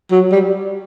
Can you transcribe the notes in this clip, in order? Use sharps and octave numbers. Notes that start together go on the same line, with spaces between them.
F#3
G3